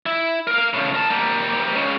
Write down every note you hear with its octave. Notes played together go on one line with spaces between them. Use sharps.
E4
A#4 F5
A2 C#3
A#4 A5
G3 A#3
C#2 C#3